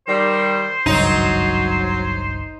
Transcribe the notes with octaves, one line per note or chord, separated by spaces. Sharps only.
D#3 G3 C5
G#1 C#2 G2 F#3 D#4